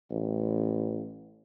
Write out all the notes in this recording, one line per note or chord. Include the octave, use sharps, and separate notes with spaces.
A1